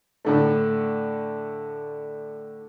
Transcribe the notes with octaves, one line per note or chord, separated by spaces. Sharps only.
A2 D3 A3